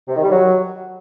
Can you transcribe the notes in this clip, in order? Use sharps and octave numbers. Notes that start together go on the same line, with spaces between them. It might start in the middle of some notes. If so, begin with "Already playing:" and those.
C3
D#3
G3
F#3